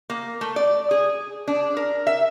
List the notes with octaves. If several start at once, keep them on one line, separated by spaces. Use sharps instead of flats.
A#3
A3
D5
G#4
D4
A#4
E5